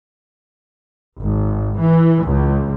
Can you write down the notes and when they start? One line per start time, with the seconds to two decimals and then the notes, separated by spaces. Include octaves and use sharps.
1.19 G#1
1.78 E3
2.24 C#2